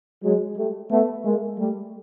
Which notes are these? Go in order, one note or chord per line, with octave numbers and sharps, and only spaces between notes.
F#3 G#3
G3 A3
A3 B3
G#3 A#3
G3 A3